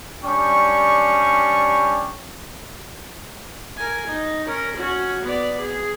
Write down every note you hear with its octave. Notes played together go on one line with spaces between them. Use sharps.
G3 C#4 D4 G5 C#6
A#4 G#5
D#4
C#4 A#4
C#4 F#4
B3 D5
G#4